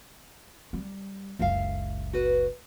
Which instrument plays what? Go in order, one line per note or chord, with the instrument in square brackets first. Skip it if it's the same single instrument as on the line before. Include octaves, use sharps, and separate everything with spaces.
[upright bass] G3
[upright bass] F#1 C#2 [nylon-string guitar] E5 F5
[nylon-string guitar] F#4 B4